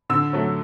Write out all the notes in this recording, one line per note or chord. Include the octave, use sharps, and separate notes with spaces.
D3 E6
F#3 A3